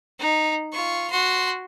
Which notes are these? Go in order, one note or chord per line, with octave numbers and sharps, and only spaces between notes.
D#4
F4 C#6
F#4 C6